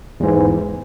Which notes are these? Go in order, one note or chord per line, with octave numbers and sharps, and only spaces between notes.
E2 G#2 E3